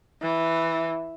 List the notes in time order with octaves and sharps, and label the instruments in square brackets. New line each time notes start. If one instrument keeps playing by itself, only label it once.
[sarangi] E3